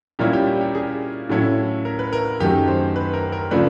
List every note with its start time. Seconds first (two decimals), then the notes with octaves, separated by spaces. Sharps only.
0.19 A#2 G3 A#3 C#4 E4 G4
0.33 G4
0.47 G4
0.61 G4
0.75 G#4
1.29 A2 F#3 A3 C#4 E4
1.85 A#4
1.99 B4
2.13 A#4
2.40 F#2 D#3 F#3 A3 G4
2.68 C5
2.96 B4
3.14 A#4
3.32 A#4
3.51 C#3 F3 A3 D4 B4